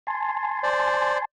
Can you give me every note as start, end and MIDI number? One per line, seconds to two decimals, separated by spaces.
0.07 1.25 80
0.07 1.25 81
0.07 1.25 84
0.63 1.18 72
0.63 1.18 74